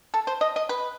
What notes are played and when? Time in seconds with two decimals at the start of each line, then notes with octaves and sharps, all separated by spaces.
0.14 A4
0.27 C5
0.41 D#5
0.56 D#5
0.69 B4